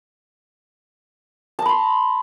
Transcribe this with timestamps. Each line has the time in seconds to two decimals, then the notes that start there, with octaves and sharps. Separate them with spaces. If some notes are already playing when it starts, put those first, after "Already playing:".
1.59 A5
1.62 D#5
1.66 B5
1.69 C6